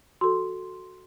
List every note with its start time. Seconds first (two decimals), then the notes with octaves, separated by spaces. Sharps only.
0.21 F#4 A4 C6